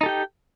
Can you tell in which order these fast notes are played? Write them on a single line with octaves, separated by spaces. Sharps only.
D#4 A4 G4 G5